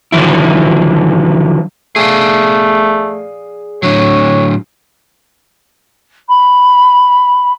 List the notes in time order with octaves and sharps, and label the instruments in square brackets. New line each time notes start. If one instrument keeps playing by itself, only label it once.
[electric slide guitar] D3 D#3 F3 F#3 E4
[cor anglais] A3 [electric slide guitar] G#4 D5 F5
[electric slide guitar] A2 D3 F#3 [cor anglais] C#5
[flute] B5